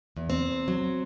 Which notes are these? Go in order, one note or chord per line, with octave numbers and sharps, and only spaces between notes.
E2
C4
E2
F#3